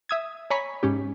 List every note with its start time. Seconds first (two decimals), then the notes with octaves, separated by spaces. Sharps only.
0.09 E5 D#6 G#6
0.50 C#5 G#5 A#5 B5 C#6 B6
0.83 G#2 C#4 G4